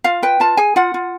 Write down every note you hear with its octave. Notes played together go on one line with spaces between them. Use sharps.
F4 F5
B4 G5
F4 A5
G#4 G#5
F4 F#5
F4